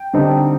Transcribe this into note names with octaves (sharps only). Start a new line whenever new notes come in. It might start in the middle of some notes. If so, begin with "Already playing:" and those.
Already playing: G5
D3 G3 C4 D#4